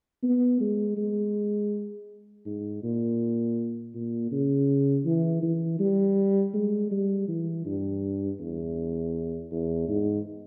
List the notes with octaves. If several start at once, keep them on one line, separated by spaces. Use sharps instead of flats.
B3
G#3
G#3
G#2
A#2
A#2
C#3
E3
E3
G3
G#3
G3
E3
G2
E2
E2
G#2